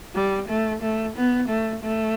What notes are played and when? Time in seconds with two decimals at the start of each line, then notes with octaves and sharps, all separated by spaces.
0.15 G3
0.48 A3
0.82 A3
1.16 B3
1.49 A3
1.83 A3